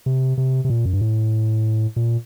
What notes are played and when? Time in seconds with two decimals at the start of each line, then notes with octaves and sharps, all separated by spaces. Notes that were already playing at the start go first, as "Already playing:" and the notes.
0.06 C3
0.38 C3
0.65 C3
0.70 A#2
0.85 F#2
0.93 G2
1.01 A2
1.96 A#2